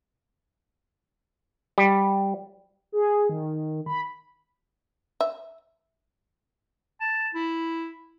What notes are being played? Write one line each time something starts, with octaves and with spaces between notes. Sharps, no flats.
G3
G#4
D#3
B5
E5
A5
E4